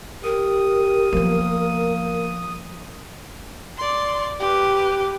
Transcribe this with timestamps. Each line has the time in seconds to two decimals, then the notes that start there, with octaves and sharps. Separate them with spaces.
0.24 G4 A#4 D#6
1.13 F3 A#3 B3
3.77 D5 C6
4.40 G4 B4